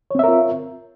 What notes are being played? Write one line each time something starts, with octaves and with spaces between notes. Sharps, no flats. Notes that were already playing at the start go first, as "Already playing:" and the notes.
C4 F4 A#4 C#5 E5